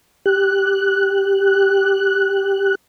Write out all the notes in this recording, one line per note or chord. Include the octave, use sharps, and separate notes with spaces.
G4 F#6